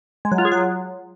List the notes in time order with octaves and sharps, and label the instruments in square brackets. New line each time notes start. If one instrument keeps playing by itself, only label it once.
[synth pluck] G#3
F#3
F4
G#4
F#3